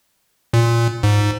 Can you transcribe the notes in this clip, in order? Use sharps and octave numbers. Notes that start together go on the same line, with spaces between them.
A#2
G#2